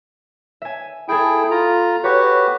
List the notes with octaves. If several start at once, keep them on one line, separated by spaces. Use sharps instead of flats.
E5 G#5
E4 G#4 A4 G5 G#6 D7
F4 A#5
F#4 G4 B4 C#5